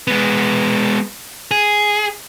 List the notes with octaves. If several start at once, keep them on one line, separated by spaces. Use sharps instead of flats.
G#3 B3
G#4